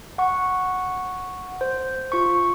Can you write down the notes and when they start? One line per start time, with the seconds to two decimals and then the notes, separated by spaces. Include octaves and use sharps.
0.18 F#5 C#6
1.61 C5
2.12 F4 C#6